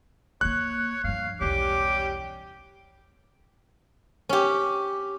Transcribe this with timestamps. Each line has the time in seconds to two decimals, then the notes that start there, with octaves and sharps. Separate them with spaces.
0.41 A#3 B3 C#5 F#6
1.04 G2 F3 F5
1.41 B1 E2 G3 C#4 G4 D6
4.29 C#4 G4